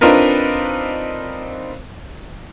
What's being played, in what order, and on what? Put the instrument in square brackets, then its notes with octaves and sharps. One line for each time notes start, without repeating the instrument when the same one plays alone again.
[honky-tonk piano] C4 D4 D#4 F4 A#4 B4